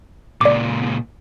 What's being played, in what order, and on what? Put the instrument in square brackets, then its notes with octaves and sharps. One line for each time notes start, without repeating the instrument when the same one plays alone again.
[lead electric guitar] C#2 A#2 [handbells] D5 D6